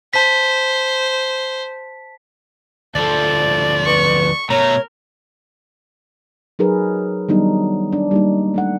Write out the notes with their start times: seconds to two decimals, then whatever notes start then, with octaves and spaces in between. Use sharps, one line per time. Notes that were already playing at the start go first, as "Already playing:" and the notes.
0.14 C5 A5 B6
2.95 D2 F3 A4 D5
3.86 B4 C#6
4.50 B2 A3 A#4 C#5 A#5
6.59 F#3 D#4 G#4 A#4 B4
7.29 D#3 F#3 G3 B3 D4 D#4
7.93 D4
8.11 G3 A#3 D#4
8.54 A3 D4 F#5